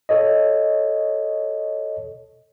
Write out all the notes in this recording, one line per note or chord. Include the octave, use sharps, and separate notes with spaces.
A4 C#5 D#5